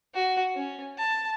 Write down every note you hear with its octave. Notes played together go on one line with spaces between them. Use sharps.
F#4
C#4
A5